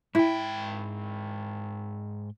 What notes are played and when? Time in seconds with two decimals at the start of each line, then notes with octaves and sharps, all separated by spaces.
0.15 G#2 E4 G5